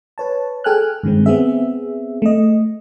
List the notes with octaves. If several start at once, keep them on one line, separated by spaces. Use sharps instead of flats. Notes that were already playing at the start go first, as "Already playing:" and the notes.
B4 C#5 A5
G#4 A4 G5 G#5 F6 F#6
G2 D#3 G#3 C4
B3 C4 G#4 E5
A3 D#5